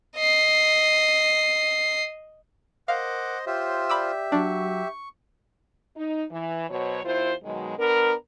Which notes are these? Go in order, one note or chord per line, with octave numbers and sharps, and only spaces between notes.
D#5 C7
A#4 C5 D#5 F5 F#5 D6
F4 G4 C5 C#5 E5
D5 B5 D6 E6
F#3 D4 C#6
D#4
E3
B2 F#3 C5 C#5
D#2 E4 F4 C5
B2 D#3 F#3 G#3
B3 D4 A#4